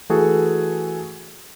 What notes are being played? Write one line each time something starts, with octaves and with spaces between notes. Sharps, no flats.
E3 A3 F#4 G#4 A4